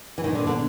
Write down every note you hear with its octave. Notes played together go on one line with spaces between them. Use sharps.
E3
A#2 D#3 F#3 B3 D4
D3
D3